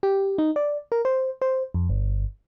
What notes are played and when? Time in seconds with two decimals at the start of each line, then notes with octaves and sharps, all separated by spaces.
0.03 G4
0.38 D#4
0.56 D5
0.92 A#4
1.05 C5
1.42 C5
1.74 F2
1.89 G1